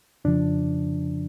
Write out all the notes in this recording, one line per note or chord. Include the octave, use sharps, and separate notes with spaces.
F2 C#3 F3 D4